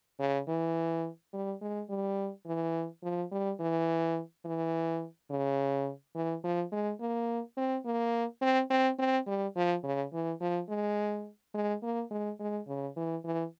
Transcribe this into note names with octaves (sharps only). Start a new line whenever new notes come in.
C#3
E3
G3
G#3
G3
E3
F3
G3
E3
E3
C#3
E3
F3
G#3
A#3
C4
A#3
C4
C4
C4
G3
F3
C#3
E3
F3
G#3
G#3
A#3
G#3
G#3
C#3
E3
E3